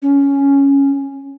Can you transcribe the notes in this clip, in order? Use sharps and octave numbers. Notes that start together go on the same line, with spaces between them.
C#4